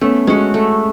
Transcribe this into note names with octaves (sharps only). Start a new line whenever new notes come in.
A3 B3 C#4
G#3 C#4 F#4
A3